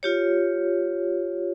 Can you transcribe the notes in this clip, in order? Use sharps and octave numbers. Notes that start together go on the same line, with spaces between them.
F4 G4 C#5